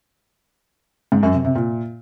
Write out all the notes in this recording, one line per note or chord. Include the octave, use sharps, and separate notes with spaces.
G#2
F#2
C3
C3
A#2